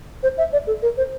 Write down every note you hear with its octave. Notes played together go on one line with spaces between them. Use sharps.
C5
E5
D5
A4
A#4
C5